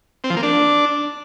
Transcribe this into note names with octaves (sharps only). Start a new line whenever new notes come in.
C4
F3
A#3
D4